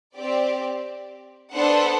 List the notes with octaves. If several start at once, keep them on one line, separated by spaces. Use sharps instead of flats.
C4 G4 D5
B3 D4 A4 C5 F#5